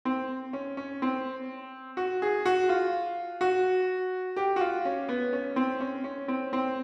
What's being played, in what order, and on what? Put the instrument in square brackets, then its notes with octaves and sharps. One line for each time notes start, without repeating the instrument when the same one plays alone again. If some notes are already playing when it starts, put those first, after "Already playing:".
[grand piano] C4
C#4
C#4
C4
F#4
G#4
F#4
F4
F#4
G4
F#4
F4
C#4
B3
C#4
C4
C#4
C#4
C4
C4